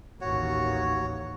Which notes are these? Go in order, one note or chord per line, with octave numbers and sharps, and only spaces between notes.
A1 D#2 F#4 C#5